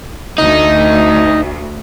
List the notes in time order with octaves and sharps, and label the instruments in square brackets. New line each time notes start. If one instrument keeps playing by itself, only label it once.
[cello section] D2 [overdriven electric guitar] D#4